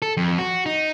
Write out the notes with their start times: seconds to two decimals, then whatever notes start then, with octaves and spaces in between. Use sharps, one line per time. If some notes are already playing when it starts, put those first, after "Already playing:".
0.02 A4
0.17 F2
0.38 F#4
0.66 D#4